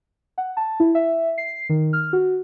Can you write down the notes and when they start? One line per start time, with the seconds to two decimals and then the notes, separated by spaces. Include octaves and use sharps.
0.38 F#5
0.57 A5
0.80 E4
0.95 E5
1.38 C7
1.69 D#3
1.93 F6
2.13 F#4